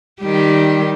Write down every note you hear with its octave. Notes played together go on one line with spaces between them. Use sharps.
D#3 G3 G4